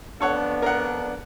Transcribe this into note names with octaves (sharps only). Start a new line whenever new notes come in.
F2 B3 D4 A4 C#5 F#5
A#4 F#5